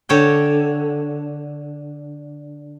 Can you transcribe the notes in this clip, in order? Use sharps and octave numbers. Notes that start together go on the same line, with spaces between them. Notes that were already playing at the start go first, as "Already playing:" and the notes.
D3 C#5 G5